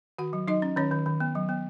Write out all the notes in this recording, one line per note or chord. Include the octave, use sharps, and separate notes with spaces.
D#3 F#4 F#5
F#3
F#3 D#4 D#5
C#4
D#3 C#4 C#5
D#3
D#3
B3
F#3
B3